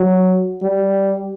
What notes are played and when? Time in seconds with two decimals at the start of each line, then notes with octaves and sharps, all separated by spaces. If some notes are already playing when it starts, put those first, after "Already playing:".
Already playing: F#3
0.62 G3